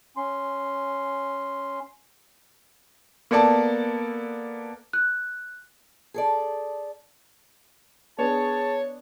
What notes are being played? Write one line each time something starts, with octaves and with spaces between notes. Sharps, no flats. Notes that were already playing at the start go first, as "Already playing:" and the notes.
C#4 C6
A#3 B3 A4 D5 A5
F#6
G#4 A4 D5
B3 D4 G#4 C#5 A5